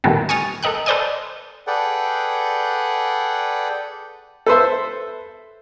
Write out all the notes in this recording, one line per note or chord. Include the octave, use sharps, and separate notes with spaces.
A#2 D#3 G3 A3 B3 C4
G#5 C#6 D#6 F6 A6
A4 A#4 D#5 G5 F#6
A4 B4 C5 D5 D#5 G#5
G#4 A4 B4 D5 F#5 G5
A4 B4 C5 E5